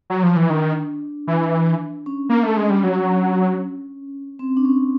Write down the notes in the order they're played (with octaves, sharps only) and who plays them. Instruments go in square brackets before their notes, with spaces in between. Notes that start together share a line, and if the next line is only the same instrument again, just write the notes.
[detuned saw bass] F#3
F3
E3
[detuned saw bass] D#3 [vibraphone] D4
[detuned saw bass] E3
[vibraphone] C#4
[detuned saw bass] A#3
A3
G#3
G3
F#3
[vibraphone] C4
D4
C#4